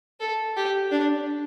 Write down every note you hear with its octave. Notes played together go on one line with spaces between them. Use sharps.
A4
G4
D4